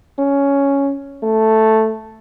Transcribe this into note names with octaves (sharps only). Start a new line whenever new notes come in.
C#4
A3